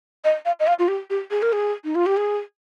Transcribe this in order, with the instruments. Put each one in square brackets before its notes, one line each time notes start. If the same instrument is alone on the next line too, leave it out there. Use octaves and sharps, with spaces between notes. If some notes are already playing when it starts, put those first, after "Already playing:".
[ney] D#5
F5
D#5
F5
F4
G4
G4
G#4
A#4
G#4
D#4
F4
G4
G#4